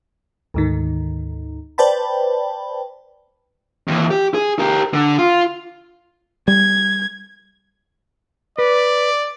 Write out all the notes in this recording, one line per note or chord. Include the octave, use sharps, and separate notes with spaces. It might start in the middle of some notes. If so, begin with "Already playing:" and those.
D2 G#2 D#3
B4 C5 D5 G5 A5 B5
D#2 E3
G4
G#4
G4 A#4
D3
F4
G3 G#6
B4 D5